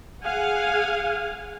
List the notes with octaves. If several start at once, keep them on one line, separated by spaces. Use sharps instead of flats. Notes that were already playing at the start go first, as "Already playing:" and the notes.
G#4 F5 F#5 G#5